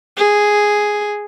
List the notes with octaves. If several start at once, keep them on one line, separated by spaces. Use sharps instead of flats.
G#4